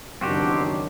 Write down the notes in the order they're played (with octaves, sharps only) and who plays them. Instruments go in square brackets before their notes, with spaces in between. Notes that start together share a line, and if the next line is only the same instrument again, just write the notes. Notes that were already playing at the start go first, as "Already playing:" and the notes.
[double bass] F#1 D4 [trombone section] E2 D#3 F#3 [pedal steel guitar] C4 F#4 G4